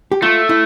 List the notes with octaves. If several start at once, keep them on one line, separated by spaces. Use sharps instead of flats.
G4
A3 F4
E4